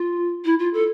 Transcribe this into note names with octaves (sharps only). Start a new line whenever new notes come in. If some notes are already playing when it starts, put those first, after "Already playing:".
Already playing: F4
E4
F4
A4